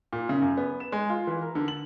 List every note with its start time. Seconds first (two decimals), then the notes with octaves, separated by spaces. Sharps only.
0.13 A#2
0.29 C#3
0.42 F#2
0.57 B3
0.80 E7
0.92 G#3
1.09 F4
1.27 E3
1.42 A#4
1.55 D3
1.68 F#7